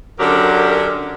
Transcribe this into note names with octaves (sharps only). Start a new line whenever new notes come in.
F#2 D3 F#3 G4 A#4 D5